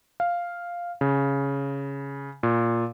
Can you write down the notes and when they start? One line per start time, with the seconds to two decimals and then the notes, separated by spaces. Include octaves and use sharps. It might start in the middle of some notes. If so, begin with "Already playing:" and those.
0.20 F5
1.01 C#3
2.43 A#2